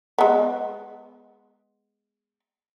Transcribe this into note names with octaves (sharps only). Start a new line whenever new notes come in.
G#3 B3